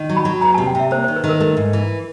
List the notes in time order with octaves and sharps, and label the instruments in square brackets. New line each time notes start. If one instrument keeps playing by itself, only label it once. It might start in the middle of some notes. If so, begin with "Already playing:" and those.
Already playing: [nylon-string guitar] D#3
F#3
[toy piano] B5
[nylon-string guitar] F#3
[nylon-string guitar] E2 [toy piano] A#5
[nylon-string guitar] C3 [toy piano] A5
[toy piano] G5
[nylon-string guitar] C3 [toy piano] E5
[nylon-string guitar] A#3 [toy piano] C5
[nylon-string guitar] D#3 [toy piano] C5
[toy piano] B4
[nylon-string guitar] D#3
[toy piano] A#4
[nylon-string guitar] A3
G#2
E3